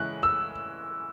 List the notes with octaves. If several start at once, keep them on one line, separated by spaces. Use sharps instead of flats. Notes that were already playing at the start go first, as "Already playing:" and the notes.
Already playing: C#3 E3 G#3 C#4 E4 F#6
E6